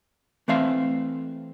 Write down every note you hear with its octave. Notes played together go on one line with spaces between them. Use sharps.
E3 A3 C4 E5 F5 C6